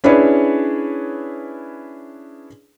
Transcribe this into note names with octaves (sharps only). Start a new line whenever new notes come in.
C#4 D4 E4 G#4 B4 C#5